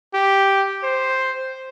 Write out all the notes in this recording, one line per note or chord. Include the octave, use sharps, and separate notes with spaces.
G4
C5